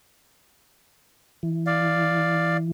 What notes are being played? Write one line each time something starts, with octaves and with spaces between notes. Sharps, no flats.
E3
D5 F5